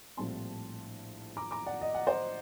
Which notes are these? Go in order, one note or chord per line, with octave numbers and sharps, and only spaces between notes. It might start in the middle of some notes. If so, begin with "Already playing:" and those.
A#1 A2 G3 C4 A5 C6
A#5 D6
A#5 D6
D5 F#5
D#5
F#5
C5 D#5